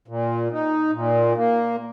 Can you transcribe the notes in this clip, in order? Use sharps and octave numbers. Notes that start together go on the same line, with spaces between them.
A#2
D#4
A#2
A#3